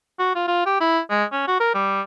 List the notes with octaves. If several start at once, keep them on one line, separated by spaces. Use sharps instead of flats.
F#4
F4
F4
G4
E4
G#3
C#4
F#4
A#4
G3